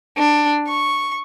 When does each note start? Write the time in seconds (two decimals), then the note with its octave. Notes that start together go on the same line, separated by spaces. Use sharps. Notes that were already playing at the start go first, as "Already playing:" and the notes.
0.17 D4
0.68 C#6